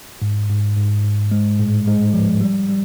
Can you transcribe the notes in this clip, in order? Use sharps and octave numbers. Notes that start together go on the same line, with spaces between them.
G#2
G#2
G#2
G#2
G#3
A2
G#3
F3
G3
G3